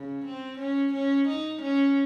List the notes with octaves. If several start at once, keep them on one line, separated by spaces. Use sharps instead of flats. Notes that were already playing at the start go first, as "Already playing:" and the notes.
Already playing: C#3
C4
C#4
C#4
D#4
C#4